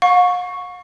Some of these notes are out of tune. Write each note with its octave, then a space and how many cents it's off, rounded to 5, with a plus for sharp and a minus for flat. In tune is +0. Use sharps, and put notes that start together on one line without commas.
F5 +45 C#6 +0